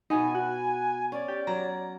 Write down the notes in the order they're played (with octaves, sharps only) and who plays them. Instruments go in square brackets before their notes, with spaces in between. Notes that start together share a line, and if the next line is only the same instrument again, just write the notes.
[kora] B2 B3 [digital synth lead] D#4 [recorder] G#5
[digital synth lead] F#4
[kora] C#4 [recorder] D5
[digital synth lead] G4
[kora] F#3 [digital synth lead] A#5